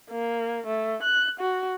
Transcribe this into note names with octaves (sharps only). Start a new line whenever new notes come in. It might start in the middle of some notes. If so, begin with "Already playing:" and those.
A#3
A3
F#6
F#4